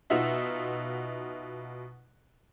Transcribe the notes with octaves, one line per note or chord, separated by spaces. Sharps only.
B2 D#4 F4 E5 F#5